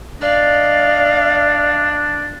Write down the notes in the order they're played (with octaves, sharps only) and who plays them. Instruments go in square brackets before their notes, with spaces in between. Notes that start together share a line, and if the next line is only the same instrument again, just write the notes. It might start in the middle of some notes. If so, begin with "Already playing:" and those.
[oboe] D4 [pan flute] D5 [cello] D#5 F5